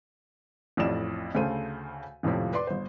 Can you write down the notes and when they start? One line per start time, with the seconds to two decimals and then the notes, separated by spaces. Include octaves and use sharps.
0.77 A1 F2 A2 D5 E7
1.35 D2 C#3 A3 C5 D#7
2.23 G#1 F2 A2 C3 F3
2.53 B4 D5 C6 D6
2.67 G1 C5